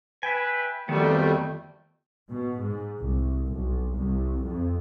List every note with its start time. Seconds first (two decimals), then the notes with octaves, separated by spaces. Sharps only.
0.23 B4 E5 G5 G#5
0.89 F2 D#3 G3 A3 B3 C4 F#4 G5
2.30 B2
2.59 G#2
2.98 C2
3.46 B1
3.95 C2
4.44 F2